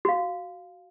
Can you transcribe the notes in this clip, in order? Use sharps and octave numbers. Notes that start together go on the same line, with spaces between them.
F#4 F5